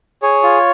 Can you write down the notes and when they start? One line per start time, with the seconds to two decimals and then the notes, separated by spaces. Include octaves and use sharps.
0.22 G#4 C#5
0.43 F4